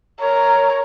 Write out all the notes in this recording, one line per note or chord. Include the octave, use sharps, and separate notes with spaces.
A#4 C#5